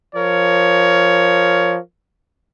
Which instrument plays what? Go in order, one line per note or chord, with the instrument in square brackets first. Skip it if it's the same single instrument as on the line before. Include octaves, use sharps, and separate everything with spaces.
[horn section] F3 A#4 C#5